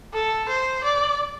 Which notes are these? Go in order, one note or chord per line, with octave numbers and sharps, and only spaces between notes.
A4
C5
D5